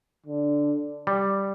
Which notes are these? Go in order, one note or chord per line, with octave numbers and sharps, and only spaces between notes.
D3
G3